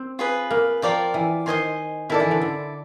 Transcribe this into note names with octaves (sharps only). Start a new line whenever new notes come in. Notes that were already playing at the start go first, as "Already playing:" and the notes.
Already playing: C4
F4 G#4 B4
A#3
F3 F4 A#4 D5 G5
E3
D#3 C5 D#5 G#5 C6
D#3 E4 A4 D5
E3
D3
D3